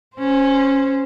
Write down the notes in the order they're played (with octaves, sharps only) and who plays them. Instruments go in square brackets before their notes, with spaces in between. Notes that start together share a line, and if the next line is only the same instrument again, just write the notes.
[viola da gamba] C#4 C5